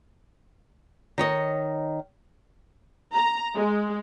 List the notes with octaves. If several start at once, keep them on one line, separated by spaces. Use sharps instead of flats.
D#3 C#5 D#5
A#5
G#3